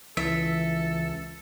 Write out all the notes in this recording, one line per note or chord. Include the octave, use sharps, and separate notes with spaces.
C#2 E3 A4 E5